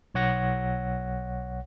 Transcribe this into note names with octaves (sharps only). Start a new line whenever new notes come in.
B1 C#5 F#5 A#6